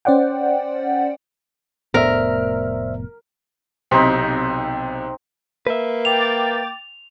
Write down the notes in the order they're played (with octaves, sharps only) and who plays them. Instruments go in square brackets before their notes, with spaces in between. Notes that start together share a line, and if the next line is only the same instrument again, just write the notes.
[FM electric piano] C#4 C5 D5 F#5 G5
[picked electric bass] F1 A2 B3 [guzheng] A#4 [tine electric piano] C5 D5 E5
[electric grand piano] B1 C3 B6 [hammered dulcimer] C4 D#4
[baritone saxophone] A#3 [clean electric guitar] B4 E5
[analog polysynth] G5 D6 A6 [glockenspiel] F7